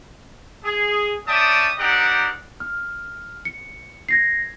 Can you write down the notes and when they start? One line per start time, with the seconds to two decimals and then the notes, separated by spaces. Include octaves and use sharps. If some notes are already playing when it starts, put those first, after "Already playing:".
0.64 G#4
1.27 C#4 D5 E5 G5 A5 D#6
1.78 C4 D#4 G4 A#4 D5 F#5
2.60 F6
3.45 C#7
4.09 G#6 A#6 C7